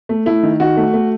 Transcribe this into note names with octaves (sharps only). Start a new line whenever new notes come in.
A3
A3 E4
D#3
D#3 F#4
A3
A3